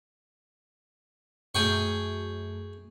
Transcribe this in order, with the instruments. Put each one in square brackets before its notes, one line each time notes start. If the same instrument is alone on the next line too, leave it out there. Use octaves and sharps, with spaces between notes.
[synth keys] F#2 A3 [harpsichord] G#4 G5 C#6